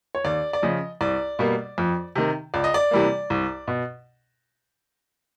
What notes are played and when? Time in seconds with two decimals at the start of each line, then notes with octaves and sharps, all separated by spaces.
0.15 C#5
0.24 D#2 D5
0.53 D5
0.63 C#3 F3 D#5
1.01 C2 D5
1.39 B2 G3 A#3
1.78 F2
2.15 C3 D#3
2.54 C#2 D5
2.64 D#5
2.74 D5
2.91 C3 E3 G3 A#3
3.30 C2
3.68 B2